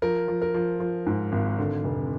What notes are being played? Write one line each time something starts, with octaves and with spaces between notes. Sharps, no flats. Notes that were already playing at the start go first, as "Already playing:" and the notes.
F3 A#4
F3
A#4
F3
F3
G#2
G#1
D3
F1